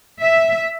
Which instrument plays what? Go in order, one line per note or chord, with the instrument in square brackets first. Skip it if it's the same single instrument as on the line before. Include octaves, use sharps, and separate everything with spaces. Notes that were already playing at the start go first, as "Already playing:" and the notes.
[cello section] E5